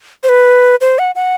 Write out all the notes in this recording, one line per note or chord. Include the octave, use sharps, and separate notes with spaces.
C5
B4
C5
F#5
F#5